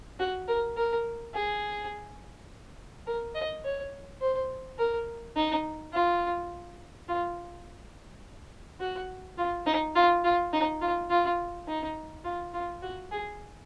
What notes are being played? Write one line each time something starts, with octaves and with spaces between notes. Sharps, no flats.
F#4
A#4
A#4
G#4
A#4
D#5
C#5
C5
A#4
D#4
F4
F4
F#4
F4
D#4
F4
F4
D#4
F4
F4
D#4
F4
F4
F#4
G#4